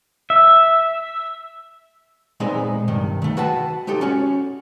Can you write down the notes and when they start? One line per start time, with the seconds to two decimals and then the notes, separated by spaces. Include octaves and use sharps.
0.30 E5
2.40 A#2 G#3 B3 C4 D#4 G#4
2.88 C2 G2 D#3
3.22 D#3 A3
3.37 F#4 B4 F#5 G5 A5
3.87 G#3 D#4 G4 A4
4.01 C#4 F#4 C#5